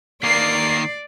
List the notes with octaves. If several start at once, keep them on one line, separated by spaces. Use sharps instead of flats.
D#3 A#3 D5 C7